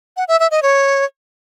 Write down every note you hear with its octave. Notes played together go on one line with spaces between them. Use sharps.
F#5
E5
E5
D#5
C#5